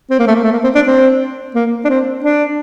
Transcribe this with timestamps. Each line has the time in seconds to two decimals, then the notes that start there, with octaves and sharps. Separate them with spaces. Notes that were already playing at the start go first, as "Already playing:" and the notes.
0.10 C4
0.19 A#3
0.27 A3
0.35 A#3
0.44 A3
0.53 A#3
0.64 C4
0.75 D4
0.87 C4
1.55 A#3
1.85 D4
1.89 C4
2.24 D4